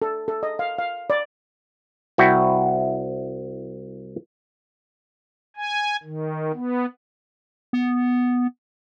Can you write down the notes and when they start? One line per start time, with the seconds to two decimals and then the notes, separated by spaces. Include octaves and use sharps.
0.02 A4
0.28 A4
0.43 D#5
0.59 F5
0.78 F5
1.10 D5
2.18 C2 E4 F#4 G5
5.57 G#5
6.03 D#3
6.54 B3
7.73 B3